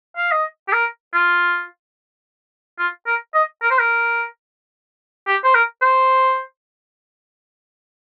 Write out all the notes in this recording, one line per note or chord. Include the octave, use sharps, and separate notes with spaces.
F5
D#5
G4
A#4
F4
F4
A#4
D#5
A#4
C5
A#4
G4
C5
A#4
C5